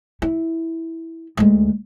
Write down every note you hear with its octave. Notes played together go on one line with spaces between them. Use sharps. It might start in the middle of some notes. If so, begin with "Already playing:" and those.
E4
D2 G#3